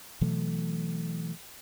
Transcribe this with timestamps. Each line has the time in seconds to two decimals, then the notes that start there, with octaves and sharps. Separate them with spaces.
0.21 B2 E3 F#3 A3